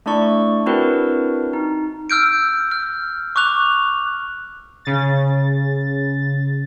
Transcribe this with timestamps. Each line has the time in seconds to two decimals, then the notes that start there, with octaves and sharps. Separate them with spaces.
0.06 A3 D4 E4 D5 C#6
0.66 C4 D4 E4 F#4 A#4 B4
1.53 D#4
2.10 E6 F6 G6 D7
2.71 F6
3.36 C#6 D6 F#6 F7
4.85 C#3 A6